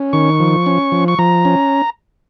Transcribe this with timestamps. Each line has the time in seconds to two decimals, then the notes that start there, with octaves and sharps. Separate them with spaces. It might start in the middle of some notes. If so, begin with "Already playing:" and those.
Already playing: C#4
0.13 D#3 C#6
0.40 F3
0.66 C#4
0.92 F3
1.08 C#6
1.19 F3 A#5
1.45 C#4